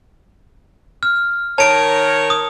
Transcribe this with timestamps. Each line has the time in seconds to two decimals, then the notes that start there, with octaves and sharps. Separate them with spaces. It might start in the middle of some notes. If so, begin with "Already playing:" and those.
1.03 F6
1.58 D#3 A#4 C#5 A5 D7
2.30 D#6